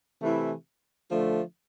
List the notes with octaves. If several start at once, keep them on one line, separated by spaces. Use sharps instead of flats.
C3 E3 A3 E4
D3 F3 A3